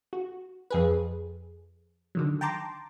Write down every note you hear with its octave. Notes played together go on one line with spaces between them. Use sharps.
F#4
F2 G#4 B4
D3 D#3 F#3
G5 A5 A#5 C6 D6